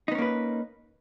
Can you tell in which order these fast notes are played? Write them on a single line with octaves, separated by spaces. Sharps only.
D#4 B3 C#4 A#3 B4